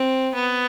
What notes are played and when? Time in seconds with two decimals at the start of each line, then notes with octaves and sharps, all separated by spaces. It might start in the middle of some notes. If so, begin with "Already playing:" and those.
Already playing: C4
0.34 B3